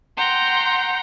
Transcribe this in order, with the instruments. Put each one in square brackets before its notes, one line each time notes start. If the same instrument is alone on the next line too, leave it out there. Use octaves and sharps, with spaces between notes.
[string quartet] F#5 G5 A#5 C6